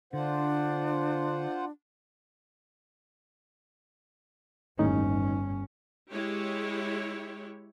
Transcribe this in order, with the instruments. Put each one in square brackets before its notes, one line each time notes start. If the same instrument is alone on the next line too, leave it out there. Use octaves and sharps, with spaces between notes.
[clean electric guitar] D3 [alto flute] D4 [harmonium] F4 C5 F#5
[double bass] G1 C#4 [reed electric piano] D#2 A2 D#4
[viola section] G#3 E4 G4 C#5